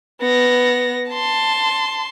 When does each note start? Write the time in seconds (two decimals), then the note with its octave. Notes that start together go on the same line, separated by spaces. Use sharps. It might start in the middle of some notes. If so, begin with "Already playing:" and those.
0.21 B3 A#6
1.10 A5 C6